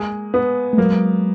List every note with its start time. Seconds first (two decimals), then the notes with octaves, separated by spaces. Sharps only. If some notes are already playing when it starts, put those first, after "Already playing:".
Already playing: G#3 A#3
0.34 B3
0.73 A3
0.78 F#3 G#3 A#3